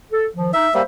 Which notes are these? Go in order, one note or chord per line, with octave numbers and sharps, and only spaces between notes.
A4
D#3 F3
D#4 E5
G3 A#3 C5 E5